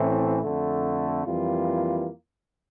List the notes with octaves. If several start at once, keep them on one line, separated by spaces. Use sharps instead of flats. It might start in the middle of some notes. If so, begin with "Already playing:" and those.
Already playing: A1 A2 E3 A3 C4
F2 D3 A3
F2 E3 G3 A#3 F4